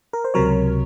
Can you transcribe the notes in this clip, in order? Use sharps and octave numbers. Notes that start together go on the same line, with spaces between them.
A#4
C5
C#2 C3 F#3 A#4 C#5